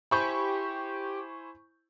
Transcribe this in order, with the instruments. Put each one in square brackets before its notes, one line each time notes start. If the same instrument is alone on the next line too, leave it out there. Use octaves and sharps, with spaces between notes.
[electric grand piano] E4 C5 G#5 [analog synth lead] G4 [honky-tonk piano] B5 C#6 G6